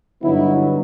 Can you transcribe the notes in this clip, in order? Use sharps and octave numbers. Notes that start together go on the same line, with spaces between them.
G2 D3 F#3 B3 D#4 E4